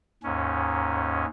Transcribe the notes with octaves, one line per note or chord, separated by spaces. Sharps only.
D#2 G#2 C#4